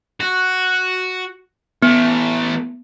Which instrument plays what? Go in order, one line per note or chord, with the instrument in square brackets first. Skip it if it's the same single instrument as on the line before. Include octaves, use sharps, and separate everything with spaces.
[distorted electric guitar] F#4
[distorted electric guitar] E3 A3 [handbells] B3